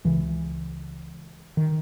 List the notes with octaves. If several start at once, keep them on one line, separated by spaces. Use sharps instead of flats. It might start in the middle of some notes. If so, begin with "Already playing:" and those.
C#2 C#3 E3
D#3